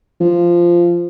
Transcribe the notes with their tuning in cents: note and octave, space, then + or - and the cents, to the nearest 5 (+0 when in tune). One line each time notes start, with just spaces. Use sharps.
F3 -10